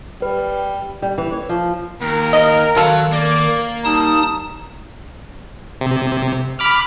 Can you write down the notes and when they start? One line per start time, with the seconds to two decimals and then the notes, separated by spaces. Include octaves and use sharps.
0.22 G3 B4
1.02 G3
1.18 E3
1.32 C#5
1.49 F3
2.02 D#2 A#4
2.33 D#5
2.77 D#3 F#3 F4 A4
3.13 A#3 D5
3.85 G3 D#4 A5 D#6
5.81 C3
6.59 B5 D6 F6